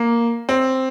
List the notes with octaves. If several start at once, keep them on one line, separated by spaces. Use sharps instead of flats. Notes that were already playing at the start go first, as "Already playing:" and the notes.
Already playing: A#3
C4